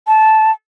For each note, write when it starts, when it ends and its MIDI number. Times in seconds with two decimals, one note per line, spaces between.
0.07 0.51 81